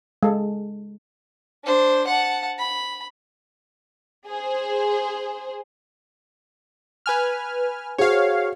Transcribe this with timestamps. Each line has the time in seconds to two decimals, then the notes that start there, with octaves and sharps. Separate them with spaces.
0.23 G#3 A4
1.64 D4 C5
2.07 F#5 A5
2.59 B5
4.28 G#4 C5
7.06 B4 G#5 F6
7.98 F#4 G#4 C5 C#5 F5